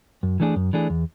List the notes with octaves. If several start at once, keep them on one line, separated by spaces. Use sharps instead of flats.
F#2
E3 A3 D4 G#4
F#2
E3 A3 D4 G#4
E2